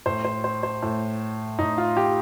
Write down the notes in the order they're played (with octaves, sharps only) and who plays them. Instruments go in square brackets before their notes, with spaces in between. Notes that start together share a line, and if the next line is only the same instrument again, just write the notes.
[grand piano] A2 C5
C5
C5
C5
A2
A2 D#4
F4
G4